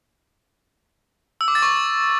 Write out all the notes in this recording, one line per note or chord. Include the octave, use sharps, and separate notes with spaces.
E6
D6
A6
C#6